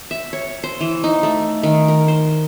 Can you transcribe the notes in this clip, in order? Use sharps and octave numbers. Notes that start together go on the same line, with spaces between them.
E5
C#5
C5
E3
D#4
A3
D#3
A#4
C5